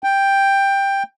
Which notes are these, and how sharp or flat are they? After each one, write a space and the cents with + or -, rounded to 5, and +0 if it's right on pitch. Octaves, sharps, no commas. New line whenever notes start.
G5 +10